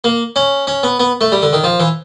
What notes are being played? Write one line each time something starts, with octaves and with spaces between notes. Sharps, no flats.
A#3
C#4
C#4
B3
B3
A3
G3
D3
D#3
F3
E3